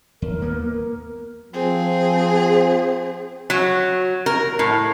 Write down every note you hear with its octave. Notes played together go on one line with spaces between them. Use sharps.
D#2 A#4
A#3 B3
F3 C4 G#4
F#3
A#4
A2